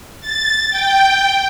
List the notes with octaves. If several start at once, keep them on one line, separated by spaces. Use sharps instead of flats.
A6
G5